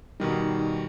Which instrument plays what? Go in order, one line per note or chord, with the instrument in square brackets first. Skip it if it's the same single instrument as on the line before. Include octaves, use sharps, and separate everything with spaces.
[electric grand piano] B2 D#3 G3 [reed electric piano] D#4